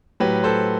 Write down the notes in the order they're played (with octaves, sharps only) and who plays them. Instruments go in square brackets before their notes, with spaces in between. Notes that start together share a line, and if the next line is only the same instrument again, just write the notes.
[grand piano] A2 F#3 G4 B4
A4 C5